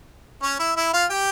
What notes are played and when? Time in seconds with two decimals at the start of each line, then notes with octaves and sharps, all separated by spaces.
0.42 C#4 C#5
0.59 E4 E5
0.76 E4 E5
0.93 F4 F5
1.10 G4 G5